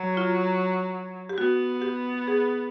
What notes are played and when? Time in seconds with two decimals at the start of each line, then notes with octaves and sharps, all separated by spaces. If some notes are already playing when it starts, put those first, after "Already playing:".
Already playing: F#3
0.17 F4
1.29 G4
1.37 B3 F#4
1.82 G4
2.27 G#4